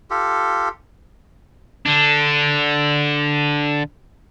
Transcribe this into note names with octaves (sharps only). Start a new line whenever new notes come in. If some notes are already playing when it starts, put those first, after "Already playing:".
F4 G4 A4
D3 D4